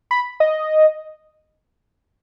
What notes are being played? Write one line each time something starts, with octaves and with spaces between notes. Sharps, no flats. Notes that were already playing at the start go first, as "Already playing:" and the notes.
B5
D#5